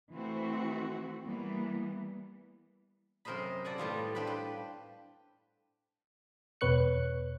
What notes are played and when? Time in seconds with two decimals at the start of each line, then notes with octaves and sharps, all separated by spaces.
0.12 E3 A3 C4 F#4
1.25 E3 G3 A#3 B3
3.25 F#2 C3 A#4 C5 D#5 B5
3.65 A4 D5 F#5 G#5
3.78 A2 G3 B3 F4
4.15 C4 D4 G4 B4 G5 B5
4.27 B4
6.61 E2 B2 B4 C#5 F#6 C#7